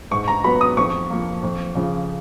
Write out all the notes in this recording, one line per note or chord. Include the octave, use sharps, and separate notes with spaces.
G#2 C#6
A#5
F#3 B3 B5
D#6
F2 C#6
F3 A#3
F2
C#3 F3